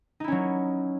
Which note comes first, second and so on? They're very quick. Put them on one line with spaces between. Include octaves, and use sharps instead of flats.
D#4 E4 C#4 F#3